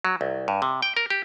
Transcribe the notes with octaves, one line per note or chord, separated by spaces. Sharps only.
F#3
C2
G2
C3
G5
A#4
G4